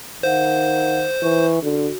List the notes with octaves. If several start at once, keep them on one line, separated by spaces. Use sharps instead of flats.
D#3 C5 F5 F#5
E3 C#6
D3 F#4